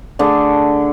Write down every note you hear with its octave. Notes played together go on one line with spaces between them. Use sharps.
D3 A3 D4 G#4